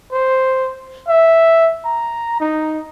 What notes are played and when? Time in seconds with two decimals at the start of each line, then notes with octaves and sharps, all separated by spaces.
0.12 C5
1.08 E5
1.85 A#5
2.40 D#4